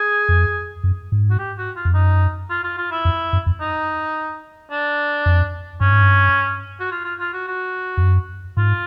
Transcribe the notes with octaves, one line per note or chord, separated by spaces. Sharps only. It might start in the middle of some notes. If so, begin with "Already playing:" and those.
Already playing: G#4
F2
F#2
G#2
F#4
G4
F#4
F4
F2
F#2 D#4
F4
F4
F4
E4
F2
F#2
F2
D#4
D4
F2
G2 C#4
G#2
G2
F#4
F4
F4
F4
F#4
F#4
F2
F#2
G#2 F4